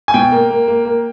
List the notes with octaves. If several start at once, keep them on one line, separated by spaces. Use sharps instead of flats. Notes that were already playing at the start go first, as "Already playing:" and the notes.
G#5
B2 G5
A#3
A#3
A#3
A#3